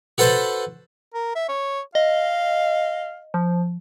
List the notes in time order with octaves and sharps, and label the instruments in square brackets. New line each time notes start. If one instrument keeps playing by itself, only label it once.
[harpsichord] F#4 A4 B4 C5 A5
[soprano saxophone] A#4
E5
C#5
[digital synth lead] D#5 [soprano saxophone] F5
[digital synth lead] F3